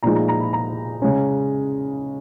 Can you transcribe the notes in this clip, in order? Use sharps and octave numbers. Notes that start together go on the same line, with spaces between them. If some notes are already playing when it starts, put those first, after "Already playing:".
A#2 F3 G#3 D#4 A#5
A#5
A#5
B5
A#5
C#3 G#3 C#4